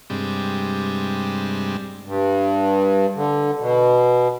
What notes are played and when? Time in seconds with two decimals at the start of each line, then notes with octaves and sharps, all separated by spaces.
0.10 G2 C3 G3 G#3 D4
2.06 G2
3.16 D3
3.60 B2